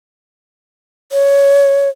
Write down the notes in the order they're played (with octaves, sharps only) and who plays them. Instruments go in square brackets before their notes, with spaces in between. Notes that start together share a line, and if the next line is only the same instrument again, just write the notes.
[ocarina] C#5